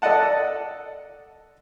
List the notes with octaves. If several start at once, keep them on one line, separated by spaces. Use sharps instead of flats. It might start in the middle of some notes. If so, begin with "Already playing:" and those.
A4 D5 D#5 F#5 A5